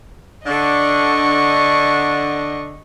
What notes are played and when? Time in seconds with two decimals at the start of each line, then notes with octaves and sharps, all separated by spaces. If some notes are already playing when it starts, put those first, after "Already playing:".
0.47 D3 D4 D#5 C#6